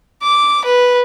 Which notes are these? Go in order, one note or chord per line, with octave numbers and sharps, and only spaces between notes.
D6
B4